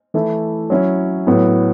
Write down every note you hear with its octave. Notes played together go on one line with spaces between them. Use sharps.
E3 A3 E4
F#3 C#4 E4
A2 F#3 B3